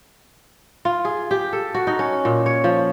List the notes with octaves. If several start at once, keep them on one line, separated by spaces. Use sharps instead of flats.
F4
G#4
G4
A4
F#4
D#4
C#4
A#2
C#5
F3